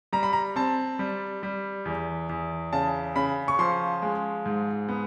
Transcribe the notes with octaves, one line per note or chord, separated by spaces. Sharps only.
G3 A#5
B5
A#5
C4 A5
G3
G3
E2
E2
C#3 A5
C#3 B5
C#6
F3 C6
G#3
G#2
B3